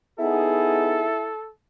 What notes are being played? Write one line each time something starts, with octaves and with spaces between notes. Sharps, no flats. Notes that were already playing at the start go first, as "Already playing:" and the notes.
B3 D#4 E4 G#4 A4